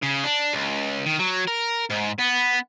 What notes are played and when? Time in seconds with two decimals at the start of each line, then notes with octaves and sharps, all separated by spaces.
0.03 C#3
0.24 D4
0.54 C#2
1.05 D#3
1.19 F#3
1.48 A#4
1.91 G#2
2.19 B3